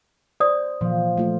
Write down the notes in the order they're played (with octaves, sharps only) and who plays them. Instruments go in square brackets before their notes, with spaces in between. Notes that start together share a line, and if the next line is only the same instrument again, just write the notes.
[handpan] C5 [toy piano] D5 D#6
[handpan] A#2 [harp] F3
[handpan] A3 F4